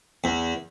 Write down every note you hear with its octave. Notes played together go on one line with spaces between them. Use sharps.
E2